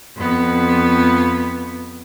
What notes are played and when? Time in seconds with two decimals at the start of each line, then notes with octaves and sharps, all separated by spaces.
0.16 F2 B3